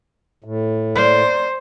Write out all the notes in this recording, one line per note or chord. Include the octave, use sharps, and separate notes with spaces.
A2
A#3 C5 D5